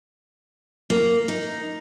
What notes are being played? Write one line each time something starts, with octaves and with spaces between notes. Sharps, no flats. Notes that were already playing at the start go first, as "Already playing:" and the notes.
A#3
D#4